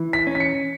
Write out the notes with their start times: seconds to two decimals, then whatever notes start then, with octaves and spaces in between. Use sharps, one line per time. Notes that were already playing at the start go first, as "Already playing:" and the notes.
Already playing: E3
0.13 B6
0.27 C#4
0.35 B6
0.40 C#7